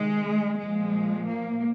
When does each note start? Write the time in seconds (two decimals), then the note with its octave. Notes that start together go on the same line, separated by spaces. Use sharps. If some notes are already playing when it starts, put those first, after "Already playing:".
Already playing: C3 D#3 G#3
0.59 A#2 F3 G#3
1.28 A#3